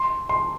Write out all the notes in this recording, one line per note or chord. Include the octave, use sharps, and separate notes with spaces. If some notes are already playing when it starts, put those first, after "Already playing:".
Already playing: C6
C6